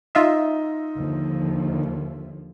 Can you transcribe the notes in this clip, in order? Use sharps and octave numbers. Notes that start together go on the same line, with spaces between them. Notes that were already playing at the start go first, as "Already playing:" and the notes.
D#4 F4 D#5 E5
D#2 D3 F3